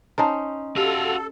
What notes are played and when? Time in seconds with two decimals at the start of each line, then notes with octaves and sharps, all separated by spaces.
0.18 C#4 D#4 C5 A5 A#5
0.76 F#4 G4 A4 F5